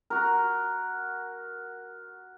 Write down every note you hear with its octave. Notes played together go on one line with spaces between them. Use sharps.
F#4 A#4